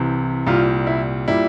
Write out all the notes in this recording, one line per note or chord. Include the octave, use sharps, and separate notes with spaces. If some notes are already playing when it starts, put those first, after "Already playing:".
Already playing: C2 C3 E3
C2 A#2 G3 F4
E4
A#2 G3 E4